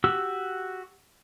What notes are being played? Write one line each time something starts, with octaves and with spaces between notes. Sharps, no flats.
F#4 G4 E6